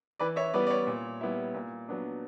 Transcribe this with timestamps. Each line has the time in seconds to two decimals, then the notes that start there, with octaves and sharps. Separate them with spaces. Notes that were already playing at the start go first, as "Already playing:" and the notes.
0.19 E3 B4 D5
0.36 C#5 E5
0.54 G3 B3 E4 B4 D5
0.67 D5
0.71 C#5
0.87 A#2
1.21 G3 B3 E4
1.54 A#2
1.88 F#3 B3 D4